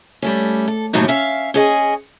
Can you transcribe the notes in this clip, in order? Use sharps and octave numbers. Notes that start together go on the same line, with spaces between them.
G3 A3 C#4
A4
D#2 A2 C3 E3 F#3 D#4
C#4 E5 F5
C#4 G#4 D#5 G#5